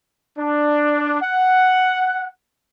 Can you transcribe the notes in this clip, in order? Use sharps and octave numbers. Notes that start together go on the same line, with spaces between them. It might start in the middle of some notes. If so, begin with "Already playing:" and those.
D4
F#5